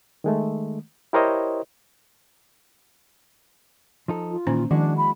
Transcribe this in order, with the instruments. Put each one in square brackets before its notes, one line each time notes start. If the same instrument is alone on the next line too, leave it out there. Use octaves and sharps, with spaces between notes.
[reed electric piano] D#3 G#3 A3
E4 G4 A#4 C5 C#5 D#5
[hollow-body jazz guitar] F3 D#4 A4
[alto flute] F4
[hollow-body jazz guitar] A#2 D#3 E3 [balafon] A#3 C#4 C5
[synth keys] D#3 [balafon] F3 [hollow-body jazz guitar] G#3 E4 F#4 [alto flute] D4
[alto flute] B5